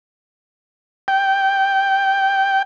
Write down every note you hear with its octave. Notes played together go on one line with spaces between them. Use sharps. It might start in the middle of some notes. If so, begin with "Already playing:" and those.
G5